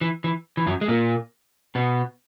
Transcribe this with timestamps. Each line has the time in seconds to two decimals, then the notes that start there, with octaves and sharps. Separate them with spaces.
0.01 E3
0.24 E3
0.57 E3
0.67 F#2 F#3
0.81 G#3
0.88 A#2 A#3
1.75 B2 B3